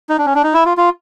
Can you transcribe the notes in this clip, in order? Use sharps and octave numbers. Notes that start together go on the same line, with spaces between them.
D#4
D4
C#4
D4
D#4
E4
F4
F4